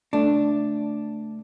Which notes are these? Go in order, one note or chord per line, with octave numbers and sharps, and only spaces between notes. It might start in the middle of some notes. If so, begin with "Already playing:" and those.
C#2 A3 D4